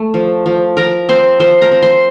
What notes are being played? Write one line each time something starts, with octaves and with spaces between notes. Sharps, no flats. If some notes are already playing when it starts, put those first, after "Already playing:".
Already playing: A3
F3
F3
F3 A#4 A#5
C4 C5 C6
F3 C5 C6
A#4 A#5
C4
C5 C6